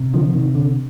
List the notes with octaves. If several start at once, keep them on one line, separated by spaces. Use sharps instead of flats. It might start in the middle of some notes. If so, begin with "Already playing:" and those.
Already playing: C3
D3 F3
C3 D#3
D3